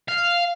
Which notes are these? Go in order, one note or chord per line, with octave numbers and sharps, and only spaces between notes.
F5